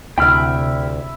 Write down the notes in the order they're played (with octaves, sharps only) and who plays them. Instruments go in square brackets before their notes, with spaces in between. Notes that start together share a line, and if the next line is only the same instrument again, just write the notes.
[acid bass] D2 [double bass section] C3 [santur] E4 E5 [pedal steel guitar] G5 B5 F6